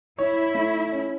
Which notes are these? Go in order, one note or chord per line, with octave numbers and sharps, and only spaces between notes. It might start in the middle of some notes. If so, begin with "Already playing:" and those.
E4 C#5
A3
C#4